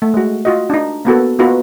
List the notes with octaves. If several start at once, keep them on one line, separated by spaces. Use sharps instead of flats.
A3
G#3 F#4
F4 F#4 D#5
D4 D#4
A#3 B3 F#4 A4
A#3 B3 D#4 F4 F#4 B4